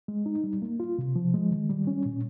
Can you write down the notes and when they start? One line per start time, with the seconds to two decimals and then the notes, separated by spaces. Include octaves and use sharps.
0.08 G#3
0.26 D#4
0.44 G3
0.62 A#3
0.80 F4
0.98 C3
1.16 F3
1.34 G#3
1.51 D#3
1.69 G3
1.87 C#4
2.05 A#2